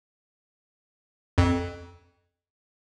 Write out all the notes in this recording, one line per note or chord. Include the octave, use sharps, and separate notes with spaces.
F2